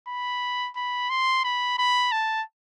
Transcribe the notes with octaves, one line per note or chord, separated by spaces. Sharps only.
B5
B5
C6
B5
B5
A5